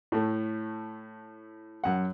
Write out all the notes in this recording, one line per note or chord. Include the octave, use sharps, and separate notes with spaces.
A2 A3
F#2 F#5